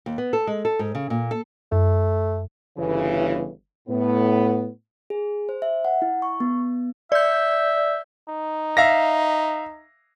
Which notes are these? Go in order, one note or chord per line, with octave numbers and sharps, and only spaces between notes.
D#2
B3
A4
G#3
A4
G#2
C#3
A#2
A4
F#2 A3
G1 C#3 E3
A2 B3
G#4
C5
E5
F#5
E4
C#6
B3
D5 E5 G6
D#4
E5 F5 A#6